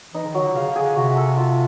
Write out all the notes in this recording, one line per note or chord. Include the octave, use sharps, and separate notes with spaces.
E3 D#4
D3
D#3
F#3
D3
C#3 F5
D3
G#4
D3
C3 F#4
A4
F4